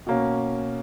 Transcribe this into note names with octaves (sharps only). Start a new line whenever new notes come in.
B2 A#3 C#4